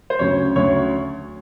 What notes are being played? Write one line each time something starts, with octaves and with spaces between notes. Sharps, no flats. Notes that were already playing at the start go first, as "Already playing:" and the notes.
C5
D2 C#3 F#3 C#5
D2 C#3 F#3 C#5